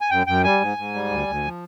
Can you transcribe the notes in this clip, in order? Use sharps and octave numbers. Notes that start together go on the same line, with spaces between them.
G#5
F#2 G5
F#2 G5
G3 G#5
G#2
G#2
G3
D2
D2
F3